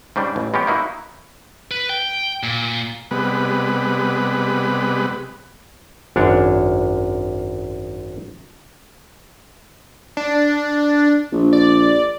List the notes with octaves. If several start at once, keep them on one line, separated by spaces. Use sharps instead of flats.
G#2 C#3 G3 D4
A1
G#3 B3 C#4 G4
A#3 D#4 E4 F#4
B4
G5
A#2
C3 G3 G#3 B3 B4
G#1 F#2 D4 C#5 F#5
D4
A#1
D5